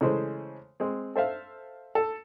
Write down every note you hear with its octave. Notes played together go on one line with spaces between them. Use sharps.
C#3 E3 G#3 A3 C5
G#3 C4
A4 C5 E5 F5
A4